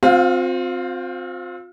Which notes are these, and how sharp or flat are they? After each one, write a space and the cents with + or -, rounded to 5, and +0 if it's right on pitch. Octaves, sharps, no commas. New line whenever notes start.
C4 +0 F4 +40 F5 +0